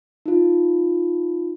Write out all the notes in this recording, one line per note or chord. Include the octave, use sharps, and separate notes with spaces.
D#4 F4